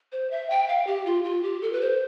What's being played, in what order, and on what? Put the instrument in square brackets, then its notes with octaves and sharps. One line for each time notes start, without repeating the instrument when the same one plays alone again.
[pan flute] C5
E5
G5
F5
G4
F4
F4
G4
A4
B4
C5